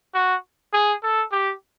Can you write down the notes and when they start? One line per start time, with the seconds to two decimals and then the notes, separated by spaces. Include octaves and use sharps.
0.15 F#4
0.73 G#4
1.03 A4
1.32 G4